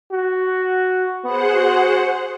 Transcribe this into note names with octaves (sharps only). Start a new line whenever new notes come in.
F#4
B3 G#4 C5 F#5
F#4